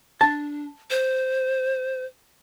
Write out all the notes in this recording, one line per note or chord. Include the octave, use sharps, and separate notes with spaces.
D4 A5
C5